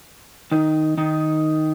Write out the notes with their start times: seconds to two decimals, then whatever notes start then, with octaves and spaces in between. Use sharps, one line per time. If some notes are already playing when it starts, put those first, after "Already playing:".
0.51 D#3 D#4
0.97 D#3 D#4